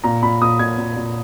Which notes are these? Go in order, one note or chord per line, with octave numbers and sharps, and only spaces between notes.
A#2 A#5
A#2 B5
A#2 D#6
A#2 G#6
A#2
A#2